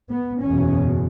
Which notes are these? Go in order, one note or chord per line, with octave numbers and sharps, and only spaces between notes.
B3
F#1 E2 B2 C#4